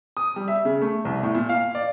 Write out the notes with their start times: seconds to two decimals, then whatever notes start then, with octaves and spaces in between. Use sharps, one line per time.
0.17 D#6
0.36 G3
0.48 E5
0.65 C#3
0.82 A3
1.05 C2
1.23 A2
1.35 A#2
1.49 F5
1.75 D5